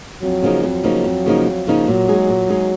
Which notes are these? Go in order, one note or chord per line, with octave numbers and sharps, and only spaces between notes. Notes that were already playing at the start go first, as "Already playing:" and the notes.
F2 F#3
C#3 F3 A#3 D#4
F2 F#3
C#3 F3 A#3 D#4
F2
C#3 F3 A#3 D#4
F2
C#3 F3 A#3 D#4
A#2 F#3
G#3 D#4 G#4
A#2
G#3 D#4 G#4